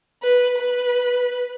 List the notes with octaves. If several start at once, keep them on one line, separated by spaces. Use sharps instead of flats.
B4
B4